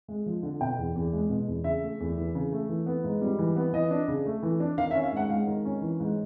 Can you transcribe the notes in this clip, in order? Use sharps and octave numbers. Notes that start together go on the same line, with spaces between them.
G#3
F3
D3
B2 G5
E2
E2
G#3
B2
E2
C#3 E5
A3
E2
E3
C#3
A3
E3
B3
G#2
G3
E3
B3
E3 D#5
D4
C#3
A3
E3
D4
D#3 F5
E5
C#4
F5
G#2 F#5
G#3 F5
D#3
C#4
E3
G#2